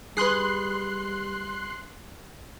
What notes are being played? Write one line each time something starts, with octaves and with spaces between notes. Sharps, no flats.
G3 G#4 B4 C6 F#6 C7